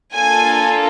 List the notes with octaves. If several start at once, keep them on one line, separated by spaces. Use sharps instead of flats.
A#3 D4 F4 A4 G#5